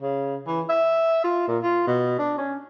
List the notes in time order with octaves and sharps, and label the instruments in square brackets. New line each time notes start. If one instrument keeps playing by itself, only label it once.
[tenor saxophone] C#3
E3
E5
F4
A#2
F4
B2
D4
C#4